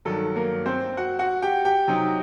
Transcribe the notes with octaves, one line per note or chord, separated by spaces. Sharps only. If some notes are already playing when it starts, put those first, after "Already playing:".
G2 D#3 F#3 A4
A#3 A#4
C4 C5
F#4 F#5
F#4 F#5
G4 G5
G4 G5
C3 F#3 C4 D#4